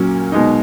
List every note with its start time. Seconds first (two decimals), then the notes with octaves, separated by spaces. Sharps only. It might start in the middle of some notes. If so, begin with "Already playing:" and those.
Already playing: A#2 F#3 A#3 C#4
0.32 B2 G#3 D#4